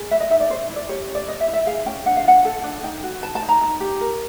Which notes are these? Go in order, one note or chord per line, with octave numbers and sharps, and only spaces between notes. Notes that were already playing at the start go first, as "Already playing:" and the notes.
Already playing: G#4
B4 E5
D#5
D#4 E5
D5
C#4 C5
E4
D5
G4 C#5
C#4
D5
B4 D#5
E5
E4
E5
G#4 F5
C#4 G5
D4 F#5
F5
F4 F#5
A4
D4
D#4 G5
F#4
B4 A5
A5
D#4
A#5
D#4
G4
A#4